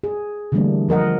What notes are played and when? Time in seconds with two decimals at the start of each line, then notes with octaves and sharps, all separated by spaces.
0.04 G#4
0.52 D3 E3 G3 A3 A#3 D4
0.89 F3 A#4 D#5 F#5